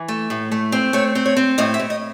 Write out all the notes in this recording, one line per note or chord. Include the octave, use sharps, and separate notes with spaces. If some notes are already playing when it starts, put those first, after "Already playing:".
Already playing: E3
A3
A2
A3
C4
A3 C#5
C4
C#5
C4
A2 D#5
E5
A2
D#5